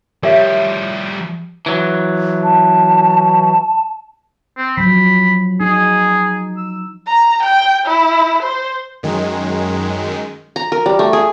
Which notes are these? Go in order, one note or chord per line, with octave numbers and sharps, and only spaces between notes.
F3 G3 G4 A#4 C#5 E5
E3 F#3
A5
C4
F3 F#3 B5
D#4 G#4
E6
A#5
G5
E4
C5
F#2 D#3 G#3
A#5
A#4
G3
A3
G#4